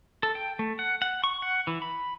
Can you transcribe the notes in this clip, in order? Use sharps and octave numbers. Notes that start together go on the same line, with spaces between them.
A4
G5
A3
F#5
F#5
C#6
F#5
E3
B5